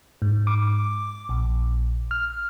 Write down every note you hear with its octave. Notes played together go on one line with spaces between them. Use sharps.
G#2
D6
A#1
F6